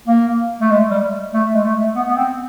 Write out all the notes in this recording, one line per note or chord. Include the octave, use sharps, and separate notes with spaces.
A#3
A3
G#3
G3
A3
G#3
A3
B3
B3
C4